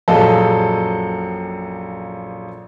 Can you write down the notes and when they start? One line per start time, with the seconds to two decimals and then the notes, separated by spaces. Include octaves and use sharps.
0.08 A#1 F#2 G#4 A4 D#5 F5